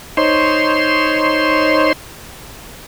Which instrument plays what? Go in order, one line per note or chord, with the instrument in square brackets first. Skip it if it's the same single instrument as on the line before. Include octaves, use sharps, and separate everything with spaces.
[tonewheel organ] D#4 C5 C#5 C6